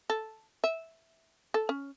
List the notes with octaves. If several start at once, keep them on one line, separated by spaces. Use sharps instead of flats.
A4
E5
A4
C#4